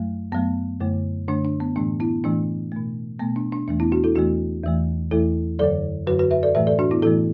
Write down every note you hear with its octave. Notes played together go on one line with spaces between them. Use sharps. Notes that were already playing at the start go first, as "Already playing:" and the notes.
Already playing: F#2 F#3 A3
F#2 F#3 A3 B3
F#2 D3 A3
F#2 D3 A3 D4
D4
B3
A2 E3 A3 D4
B3 E4
A2 E3 A3 D4
B2 A3
B2 A3 B3
D4
D4
E2 E3 A3 D4
B3 E4
D4 F#4
E4 A4
E2 E3 A3 D4 F#4
E2 E3 A3
E2 E3 A3 E4 A4
F#2 D3 F#3 A4 D5
F#2 D3 F#3 F#4 B4
F#4 B4
B4 E5
A4 D5
A2 E3 A3 B4 E5
A4 D5
D4 F#4
B3 E4
A2 E3 A3 E4 A4